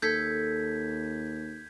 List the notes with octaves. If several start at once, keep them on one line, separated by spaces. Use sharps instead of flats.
D#2 A4 G6 G#6 B6